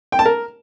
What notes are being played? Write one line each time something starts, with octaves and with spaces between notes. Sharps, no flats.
G5
A5
A#4